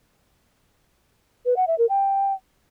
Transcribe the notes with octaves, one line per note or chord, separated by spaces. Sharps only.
B4
F#5
E5
A#4
G5